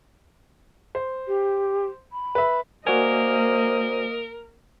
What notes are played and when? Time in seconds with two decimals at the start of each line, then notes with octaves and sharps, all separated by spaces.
0.95 C5
1.28 G4
2.12 B5
2.35 B4 E5
2.87 A#3 F#4 A#4 C5 D5 D#5 G#5